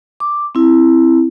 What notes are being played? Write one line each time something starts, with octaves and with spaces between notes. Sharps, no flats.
D6
C4 E4